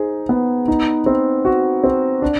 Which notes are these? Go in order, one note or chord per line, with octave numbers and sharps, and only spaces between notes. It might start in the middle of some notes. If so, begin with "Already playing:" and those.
Already playing: D#4 G#4 C5
B3
D#4
C4
F#4
C4
D4